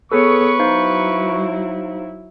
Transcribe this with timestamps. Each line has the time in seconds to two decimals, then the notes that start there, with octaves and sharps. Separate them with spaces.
0.12 B3 G#4 A4 B4 C#5 C#6
0.60 F#3 D#4 E4 C5 F5